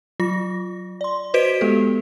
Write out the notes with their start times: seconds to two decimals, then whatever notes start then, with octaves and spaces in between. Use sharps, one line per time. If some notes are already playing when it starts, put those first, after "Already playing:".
0.20 F#3 F4 A#6
1.01 D5 C6
1.34 F#4 B4 C5 D#5 B6 D7
1.61 G#3 B3 G4 A4